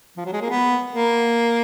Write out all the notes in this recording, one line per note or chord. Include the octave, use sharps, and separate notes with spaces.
F3
F#3
G#3
A#3
B3
A#3